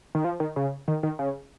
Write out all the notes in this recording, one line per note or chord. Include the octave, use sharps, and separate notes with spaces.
D#3
F3
D#3
C#3
D#3
D#3
C#3